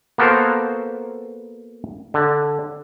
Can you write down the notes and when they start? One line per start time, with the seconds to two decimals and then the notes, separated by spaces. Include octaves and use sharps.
0.18 A#3 B3 F#4 A4 A#4 C5
2.14 D3